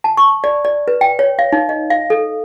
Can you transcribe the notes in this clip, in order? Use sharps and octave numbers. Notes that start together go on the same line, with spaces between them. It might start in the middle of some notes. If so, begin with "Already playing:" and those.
A5
C#6
D5
D5
B4
G5
C#5
F5
D#4
D#5
F5
A4